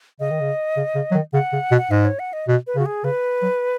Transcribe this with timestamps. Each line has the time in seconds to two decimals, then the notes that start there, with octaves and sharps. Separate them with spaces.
0.20 C#3 D#5
0.31 D#3
0.40 C#3
0.77 C#3
0.95 C#3
1.11 F#3
1.15 D#3
1.33 C#3 F#5
1.53 C#3
1.71 B2
1.78 F#5
1.91 G#2 D#5
2.05 C#5
2.19 F#5
2.33 D#5
2.48 B2
2.67 B4
2.76 C#3 F#4
2.86 G#4
3.04 C#3 B4
3.42 F#3